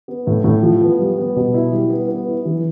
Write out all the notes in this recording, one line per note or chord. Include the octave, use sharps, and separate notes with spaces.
B3
A2
A2
F3
B3
G3
B3
B2
E4
G3
B3
B3
E4
E3